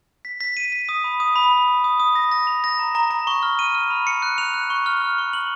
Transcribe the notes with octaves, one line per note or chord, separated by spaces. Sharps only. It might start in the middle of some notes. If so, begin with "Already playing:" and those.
B6
B6
D#7
B6
D#6
B5
D#6
B5
D#6
D#6
D#6
D#6
A#6
A#6
F7
A#6
A#5
A#5
A#5
C#6
F6
D#7
F6
B5
C#7
F#6
F7
F#6
C#6
F6
F6
C#6
F#7